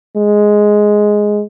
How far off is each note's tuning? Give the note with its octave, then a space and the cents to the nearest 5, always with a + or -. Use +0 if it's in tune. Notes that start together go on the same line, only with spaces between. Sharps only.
G#3 +5